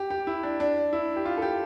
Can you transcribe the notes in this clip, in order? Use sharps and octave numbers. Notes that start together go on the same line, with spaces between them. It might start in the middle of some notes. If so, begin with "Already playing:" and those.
Already playing: G4
G4
E4
D4
D4
E4
G4
F4
A4
G4